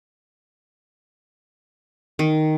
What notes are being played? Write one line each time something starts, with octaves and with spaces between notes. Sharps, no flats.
D#3